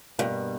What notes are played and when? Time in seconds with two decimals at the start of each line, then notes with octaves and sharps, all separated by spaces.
0.18 G2 B2 G3 A#3